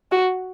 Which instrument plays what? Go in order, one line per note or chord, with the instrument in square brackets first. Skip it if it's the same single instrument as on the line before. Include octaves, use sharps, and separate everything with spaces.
[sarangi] F#4